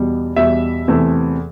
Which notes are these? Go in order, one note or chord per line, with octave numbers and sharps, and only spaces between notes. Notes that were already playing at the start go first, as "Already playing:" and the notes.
Already playing: E2 B2 G3
E2 B2 G3 E5
E2 C3 E3 A3